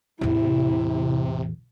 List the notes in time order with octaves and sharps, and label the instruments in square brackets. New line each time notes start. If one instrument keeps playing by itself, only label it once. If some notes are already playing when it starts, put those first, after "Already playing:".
[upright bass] A1 E2 [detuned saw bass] C3 [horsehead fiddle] E4